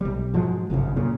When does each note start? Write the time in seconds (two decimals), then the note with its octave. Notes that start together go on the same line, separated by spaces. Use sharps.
0.01 B1 G3
0.34 G#2 F3 F#3 G#3
0.70 G1 C2 F#2 C#3
0.96 A#2 C#3